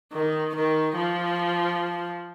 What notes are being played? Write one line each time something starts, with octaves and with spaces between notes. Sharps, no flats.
D#3
D#3
F3